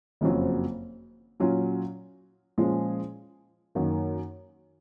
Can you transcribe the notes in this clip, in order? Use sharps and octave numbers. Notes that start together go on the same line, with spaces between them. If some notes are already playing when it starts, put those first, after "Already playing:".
F#1 F2 C#3 F#3 C4
A#2 F#3 C#4 F4
A#2 F3 G#3 C#4 G#4
F#2 D#3 A#3